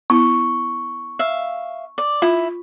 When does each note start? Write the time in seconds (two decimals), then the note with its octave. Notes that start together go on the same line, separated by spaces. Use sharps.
0.10 B3 E4 C#6
1.19 E5 F5
1.98 D5
2.22 E4 F4